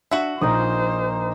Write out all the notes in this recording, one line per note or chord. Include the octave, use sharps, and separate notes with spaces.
D4 F#4 E5
A#1 A#2 D#4 A#4 C5 D#6